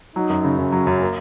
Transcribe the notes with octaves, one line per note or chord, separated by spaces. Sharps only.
F#3 D#4
F#2
C#3
F#2 C#4
F#3
F#2
A#3